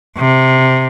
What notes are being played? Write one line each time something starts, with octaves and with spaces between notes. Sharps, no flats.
C3